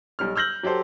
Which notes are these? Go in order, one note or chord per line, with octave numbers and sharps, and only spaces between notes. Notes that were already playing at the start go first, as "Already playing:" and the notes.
B1 G3 F6
E6 F6 G6 A#6 F#7
F#3 G4 A4 C5